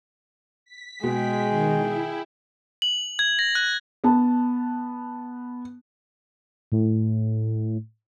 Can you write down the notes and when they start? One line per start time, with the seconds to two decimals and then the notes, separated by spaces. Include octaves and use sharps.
0.65 B6
1.04 B2 G#3 G#4 G5
1.48 D#3
1.78 E4
2.82 F#7
3.19 G#6
3.39 A#6
3.55 F#6
4.04 B3 A5
6.72 A2